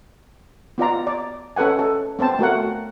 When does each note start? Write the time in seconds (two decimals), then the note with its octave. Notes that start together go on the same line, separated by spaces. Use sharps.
0.78 B3 F4 D5 A#5
1.07 D5
1.56 C#4 A4 B4 F#5 G#5
1.79 A4
2.19 B3 C4 C5 A5
2.39 A3 F#4 A#4 F#5